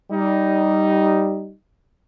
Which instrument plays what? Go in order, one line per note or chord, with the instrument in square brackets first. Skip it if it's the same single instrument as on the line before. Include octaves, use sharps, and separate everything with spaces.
[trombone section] G3 D#4